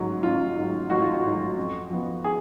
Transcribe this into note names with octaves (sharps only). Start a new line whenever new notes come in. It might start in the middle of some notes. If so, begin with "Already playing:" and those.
Already playing: A1 G#2 F#3
A1 F4
G#2 F#3
A1 F#4
F4
F#4
G#2 F#3
F2
F3 B3
G#4